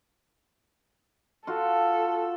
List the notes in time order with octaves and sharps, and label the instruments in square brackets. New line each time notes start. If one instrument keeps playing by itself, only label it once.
[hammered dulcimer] F4 F#4 [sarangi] A4